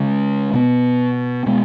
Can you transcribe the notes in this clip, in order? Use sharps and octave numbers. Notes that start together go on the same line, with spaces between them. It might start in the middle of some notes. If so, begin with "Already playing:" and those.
Already playing: C#3 G#3 C#4
B2 B3
B2 G#3 B3